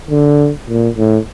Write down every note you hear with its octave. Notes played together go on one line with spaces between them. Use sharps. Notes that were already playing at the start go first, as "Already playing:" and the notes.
D3
A#2
A2